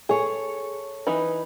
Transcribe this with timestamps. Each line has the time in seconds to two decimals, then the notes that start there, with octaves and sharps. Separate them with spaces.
0.09 G#4 A4 C#5
1.07 E3 D#4 B4